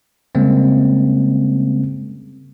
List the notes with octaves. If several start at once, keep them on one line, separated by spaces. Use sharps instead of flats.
C#3 G3 G#3 A#3 C4 C#4